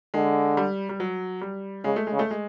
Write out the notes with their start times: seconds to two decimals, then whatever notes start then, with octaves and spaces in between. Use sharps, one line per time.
0.14 D3 G#3
0.57 G3
0.89 G3
1.00 F#3
1.41 G3
1.84 C#3 G#3
1.96 A3
2.07 G#3
2.13 C#3
2.19 A3
2.31 G#3